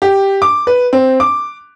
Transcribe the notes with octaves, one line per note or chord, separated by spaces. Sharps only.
G4
D6
B4
C4
D6